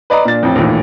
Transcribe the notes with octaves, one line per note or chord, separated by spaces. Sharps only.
B4 D5 D#5 A#5
A#2 D4 A6
A1 F2
A#1 D#2 A2 E3